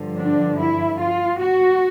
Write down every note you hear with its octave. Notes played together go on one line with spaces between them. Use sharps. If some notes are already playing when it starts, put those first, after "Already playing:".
Already playing: G2 D3 F3
D4
E4
F4
F#4